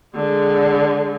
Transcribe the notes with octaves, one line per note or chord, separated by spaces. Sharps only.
D3 G#3